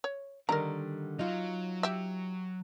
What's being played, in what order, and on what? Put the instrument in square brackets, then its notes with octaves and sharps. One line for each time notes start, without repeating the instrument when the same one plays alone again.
[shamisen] C#5
[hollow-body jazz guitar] D3 D#3 G3 [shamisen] A#4 A#5
[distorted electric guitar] F#3 [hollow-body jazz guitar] D#4 F4
[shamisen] G4 E5